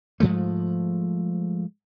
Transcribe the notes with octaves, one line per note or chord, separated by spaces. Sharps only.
G#2 F3 G#3 A3